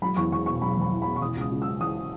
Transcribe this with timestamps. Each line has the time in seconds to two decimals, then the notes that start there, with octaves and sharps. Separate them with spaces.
0.02 F#3 B5
0.17 E2 C#6
0.31 E2 C#6
0.46 B2 C#6
0.62 F#3 B5
0.77 E2 B5
0.91 E2
1.02 B5
1.07 B2
1.16 C#6
1.22 E3 D#6
1.36 C#2 D#6
1.52 C#2
1.62 E6
1.66 C#3
1.81 E3 D#6